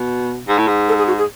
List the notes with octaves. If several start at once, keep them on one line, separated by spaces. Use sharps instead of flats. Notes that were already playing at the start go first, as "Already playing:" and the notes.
Already playing: B2
G#2
A2
G#2
A4
G#4
F#4
G#4